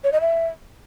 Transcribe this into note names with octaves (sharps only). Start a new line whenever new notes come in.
C#5
D#5
E5